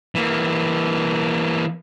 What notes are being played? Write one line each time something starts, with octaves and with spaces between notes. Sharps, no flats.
E3 A#3